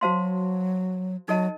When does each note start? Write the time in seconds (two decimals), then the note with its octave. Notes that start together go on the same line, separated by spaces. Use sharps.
0.01 F#3 A3 F#4 C5 F5 A5 C6
1.28 F#3 D#4 A4 D#5 A5